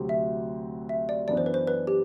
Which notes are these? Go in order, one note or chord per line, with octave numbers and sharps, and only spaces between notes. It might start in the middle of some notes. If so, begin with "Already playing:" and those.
Already playing: D2 C3 F#3 C4 G4
E5
E5
D5
F#2 E3 B3 D4 D5
C5
B4
C5
B4
G4